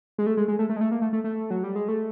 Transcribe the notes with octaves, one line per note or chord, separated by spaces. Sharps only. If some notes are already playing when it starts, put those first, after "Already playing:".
G#3
A3
G#3
G#3
A3
A3
G#3
A3
A#3
A3
A3
A3
F#3
G3
G#3
A3